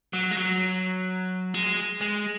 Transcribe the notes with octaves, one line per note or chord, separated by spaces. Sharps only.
F#3
G#3
F#3
G#3
G#3